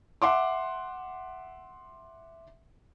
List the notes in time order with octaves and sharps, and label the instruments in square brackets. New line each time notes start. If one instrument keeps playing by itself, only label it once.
[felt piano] E5 F#5 C6 D6